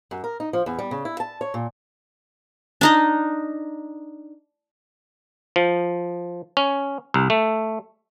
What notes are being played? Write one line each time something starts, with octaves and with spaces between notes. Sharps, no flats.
F#2
A#4
D#4
F3
E2
G3
C#3
E4
A5
C#5
A#2
D4 D#4 D#5
F3
C#4
C2
A3